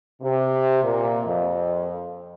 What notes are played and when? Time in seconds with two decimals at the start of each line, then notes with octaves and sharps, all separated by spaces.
0.22 C3
0.83 A#2
1.25 F2